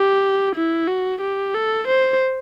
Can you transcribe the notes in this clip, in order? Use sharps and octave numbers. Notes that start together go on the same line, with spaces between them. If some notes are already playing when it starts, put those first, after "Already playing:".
Already playing: G4
E4
F#4
G4
A4
C5